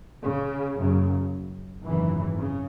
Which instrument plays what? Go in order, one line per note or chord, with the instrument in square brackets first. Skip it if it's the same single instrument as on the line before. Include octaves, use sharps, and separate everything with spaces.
[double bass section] C#3
F#1 F#2 C#3
G#1 F#2 C#3 E3
C#3